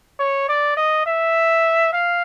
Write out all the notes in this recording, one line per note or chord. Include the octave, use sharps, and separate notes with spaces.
C#5
D5
D#5
E5
F5